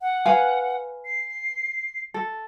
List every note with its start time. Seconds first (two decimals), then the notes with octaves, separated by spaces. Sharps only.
0.01 F#5
0.26 B4 F5 G#5
1.05 C7
2.14 A4